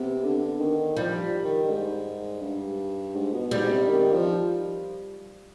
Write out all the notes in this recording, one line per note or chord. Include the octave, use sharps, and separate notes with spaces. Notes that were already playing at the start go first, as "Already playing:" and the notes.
Already playing: C3 B3
D3
D#3
F3 G3
D#3
G#2
G2
G#2
B2
G#2 G3
C3
D#3
F3